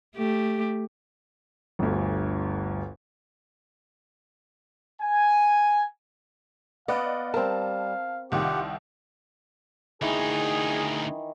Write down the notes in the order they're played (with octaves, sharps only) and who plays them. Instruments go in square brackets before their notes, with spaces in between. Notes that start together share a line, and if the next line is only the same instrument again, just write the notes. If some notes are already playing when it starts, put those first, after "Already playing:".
[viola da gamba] A3 G4
[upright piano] G1 D2
[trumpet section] G#5
[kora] B3 [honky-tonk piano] D5 D#5 F#5 [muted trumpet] F5
[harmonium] G3 [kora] C4 A#4 [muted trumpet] F5 [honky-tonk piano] A5
[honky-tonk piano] C2 D#3 [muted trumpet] F4 [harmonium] G4 F#5
[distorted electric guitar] D2 D#4 [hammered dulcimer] D#3 E3 [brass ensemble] G#4